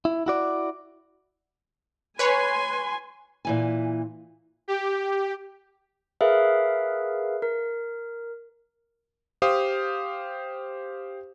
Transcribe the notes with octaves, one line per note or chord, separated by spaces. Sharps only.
E4
E4 F#4 D5
B4 C#5 G#5 C6
A#2 E3 G#5
G4
G#4 A#4 B4 E5 F5
A#4
G4 C5 F5 D#6